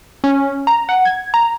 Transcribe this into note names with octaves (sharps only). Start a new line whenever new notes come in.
C#4
A#5
F#5
G#6
A#5